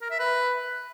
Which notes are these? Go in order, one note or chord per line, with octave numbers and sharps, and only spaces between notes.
A#4
E5
B4